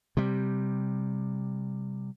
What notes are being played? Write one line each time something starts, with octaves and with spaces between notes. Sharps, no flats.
C3 G3